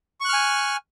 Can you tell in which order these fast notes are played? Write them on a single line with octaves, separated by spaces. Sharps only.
C#6 F#6 F6 G#5